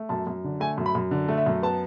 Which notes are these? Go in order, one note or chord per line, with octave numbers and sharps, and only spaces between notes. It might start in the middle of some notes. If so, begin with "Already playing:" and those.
Already playing: A3
F#2 A5
F#2
D3
A3 G#5
F#2
B5
F#2
D3
A3
E5
F#2
B3 A5